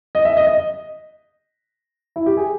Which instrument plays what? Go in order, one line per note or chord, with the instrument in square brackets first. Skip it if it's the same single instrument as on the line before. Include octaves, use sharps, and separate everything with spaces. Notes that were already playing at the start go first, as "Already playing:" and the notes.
[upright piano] D#5
E5
D#5
D#5
E4
G4
G#4